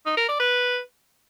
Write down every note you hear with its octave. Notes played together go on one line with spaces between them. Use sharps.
D#4
A#4
D5
B4